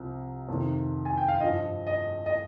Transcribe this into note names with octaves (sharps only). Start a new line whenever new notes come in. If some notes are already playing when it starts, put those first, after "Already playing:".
Already playing: C2 C3 F3
F2 C3 D#3
G#5
G5
F5
G2 F3 D#5
D#5
D#5